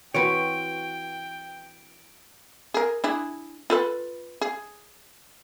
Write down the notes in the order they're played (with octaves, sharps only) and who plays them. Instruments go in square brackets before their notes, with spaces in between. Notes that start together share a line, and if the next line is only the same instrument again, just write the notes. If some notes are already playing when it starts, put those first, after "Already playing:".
[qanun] E3 C4 F#4 [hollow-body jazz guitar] B4 C#5 [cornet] G5 [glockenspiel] D7
[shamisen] G#4 A#4
D4 E4 G#4
F4 A4 B4
G#4